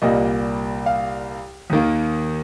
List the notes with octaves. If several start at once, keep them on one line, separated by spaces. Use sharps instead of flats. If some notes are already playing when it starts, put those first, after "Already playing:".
C2 A#2 G3 A#3 D#5
F5
D#2 D#3 A#3